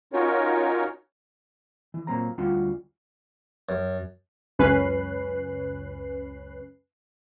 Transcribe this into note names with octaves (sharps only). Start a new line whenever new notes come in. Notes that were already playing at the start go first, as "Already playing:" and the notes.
C#4 D#4 F4 F#4 A#4 C#5
E3
A#2 F#3 A#3 C4 A#5
D2 G3 C#4 F4 F#4
F#2
C#2 F#2 C#4 B4 F#6 C7